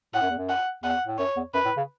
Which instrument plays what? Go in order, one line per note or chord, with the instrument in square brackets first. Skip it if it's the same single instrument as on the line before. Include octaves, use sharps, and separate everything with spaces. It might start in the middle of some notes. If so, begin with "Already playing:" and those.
[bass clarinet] A2 [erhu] F#5
[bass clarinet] F#2
E2
F#2
[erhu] F#5
[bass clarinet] E2 [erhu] F#5
[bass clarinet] A2
[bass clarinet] F#2 [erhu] C#5
[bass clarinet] E2
[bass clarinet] F#2 [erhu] B4
[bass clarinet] A2
C#3